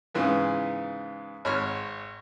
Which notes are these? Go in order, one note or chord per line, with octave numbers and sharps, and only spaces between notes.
G#2 C#3 E3 B3
G#1 C#5 B5 F6